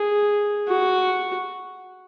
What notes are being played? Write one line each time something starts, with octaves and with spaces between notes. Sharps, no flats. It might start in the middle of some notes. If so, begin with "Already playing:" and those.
Already playing: G#4
F#4